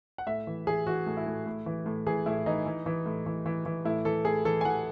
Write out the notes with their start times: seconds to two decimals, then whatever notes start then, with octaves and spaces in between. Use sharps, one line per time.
0.18 F#5
0.27 A2 E5
0.47 E3
0.67 E3 G#4
0.86 E3 F#4
1.06 A2
1.17 E4
1.26 A2
1.46 A2
1.66 E3
1.86 A2
2.06 E3 G#4
2.26 A2 E4
2.46 E3 D#4
2.66 E3
2.86 E3
3.06 A2
3.26 E3
3.46 E3
3.66 E3
3.85 A2 E4
4.05 E3 A4
4.25 A2 G#4
4.45 E3 A4
4.61 G#5
4.65 E3 F#5